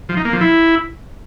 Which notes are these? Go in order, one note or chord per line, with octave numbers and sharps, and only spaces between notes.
F3
D#4
A#3
F3
E4